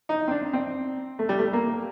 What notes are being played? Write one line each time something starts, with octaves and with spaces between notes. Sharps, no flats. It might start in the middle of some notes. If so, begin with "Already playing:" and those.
D#4
C4
D4
C4
A3
G3
A3
A#3